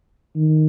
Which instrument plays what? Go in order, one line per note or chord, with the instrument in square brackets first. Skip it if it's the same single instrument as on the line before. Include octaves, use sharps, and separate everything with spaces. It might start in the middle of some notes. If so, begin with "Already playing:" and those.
[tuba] D#3